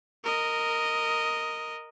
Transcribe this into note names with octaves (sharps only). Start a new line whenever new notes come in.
A#4 D#5